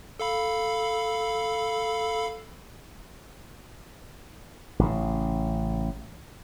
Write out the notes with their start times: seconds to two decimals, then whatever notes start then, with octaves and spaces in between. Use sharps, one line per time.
0.20 A4 F5 B5
4.79 A1 C#3